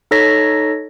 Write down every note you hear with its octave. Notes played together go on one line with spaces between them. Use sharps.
D#4 A4 C#5 A#6 B6